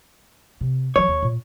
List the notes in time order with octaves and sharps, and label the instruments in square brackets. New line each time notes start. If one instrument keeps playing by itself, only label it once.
[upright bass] C3
[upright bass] E3 F#3 [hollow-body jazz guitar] C#5
[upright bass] D#2
A#2